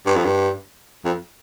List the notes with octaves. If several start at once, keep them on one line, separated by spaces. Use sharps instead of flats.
G2
F2
G2
F2